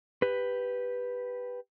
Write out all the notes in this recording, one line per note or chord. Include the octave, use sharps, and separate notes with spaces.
G4 B4